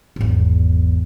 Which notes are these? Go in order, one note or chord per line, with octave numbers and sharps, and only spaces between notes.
G#1 E2